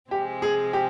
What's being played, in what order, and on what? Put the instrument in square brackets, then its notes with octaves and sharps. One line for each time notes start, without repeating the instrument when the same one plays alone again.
[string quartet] C3 F3 G#3 C4 [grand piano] G4
[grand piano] G#4
G4